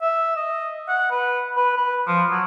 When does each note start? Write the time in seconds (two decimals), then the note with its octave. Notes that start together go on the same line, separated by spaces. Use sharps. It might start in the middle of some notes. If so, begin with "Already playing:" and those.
0.02 E5
0.36 D#5
0.89 F#5
1.11 B4
1.57 B4
1.77 B4
2.07 F3
2.30 F#3